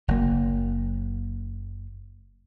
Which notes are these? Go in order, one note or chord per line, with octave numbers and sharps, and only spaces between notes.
F#1 F#2 A#3